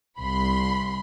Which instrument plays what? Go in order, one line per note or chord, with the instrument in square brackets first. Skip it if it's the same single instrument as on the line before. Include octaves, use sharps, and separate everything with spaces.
[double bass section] C2 [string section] B5 C6